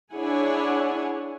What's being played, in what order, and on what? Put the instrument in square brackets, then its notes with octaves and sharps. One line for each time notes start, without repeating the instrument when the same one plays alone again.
[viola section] D4 E4 G#4 C#5 F#5 G#5